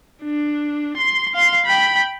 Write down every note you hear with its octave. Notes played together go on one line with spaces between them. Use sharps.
D4
C6
F5 C6
G5 B5